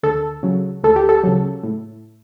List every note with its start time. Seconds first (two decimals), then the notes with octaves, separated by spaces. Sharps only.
0.03 D2 A4
0.43 C#3 F#3
0.83 D2 A4
0.96 G4
1.09 A4
1.24 C#3 F#3
1.63 A2